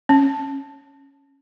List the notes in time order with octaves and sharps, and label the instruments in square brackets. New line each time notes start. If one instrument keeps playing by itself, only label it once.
[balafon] C#4